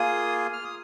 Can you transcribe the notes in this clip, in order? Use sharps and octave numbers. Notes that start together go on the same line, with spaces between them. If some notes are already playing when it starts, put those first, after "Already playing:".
Already playing: A#3 F4 G#4 D#6
F6
D#6